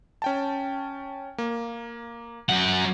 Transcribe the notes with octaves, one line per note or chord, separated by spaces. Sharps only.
C#4 G5 A5
A#3
F#2 F#5